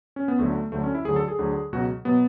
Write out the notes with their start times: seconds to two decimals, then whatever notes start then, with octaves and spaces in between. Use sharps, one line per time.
0.16 C#4
0.28 B3
0.39 D2 D3 F#3 A3
0.72 D2 D3 F#3 A3
0.84 C#4
0.95 E4
1.05 D2 G#4
1.08 D3 F#3
1.16 A4
1.28 G#4
1.39 D2 D3 F#3
1.72 C#2 B2 F#3 F#4
2.05 B2 F#3 B3